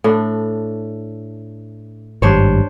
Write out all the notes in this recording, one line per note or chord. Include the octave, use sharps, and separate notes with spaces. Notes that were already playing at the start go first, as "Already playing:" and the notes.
A2 D4
G#1 G2 G3 D4 C5 C#5